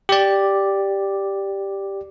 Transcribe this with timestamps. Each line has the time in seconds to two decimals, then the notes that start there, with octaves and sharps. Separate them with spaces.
0.09 G4 D5